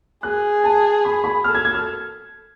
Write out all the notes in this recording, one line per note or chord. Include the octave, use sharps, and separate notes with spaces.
G#4 F#6
A5
B5
B5
A4 F6
G#6
G#6
F6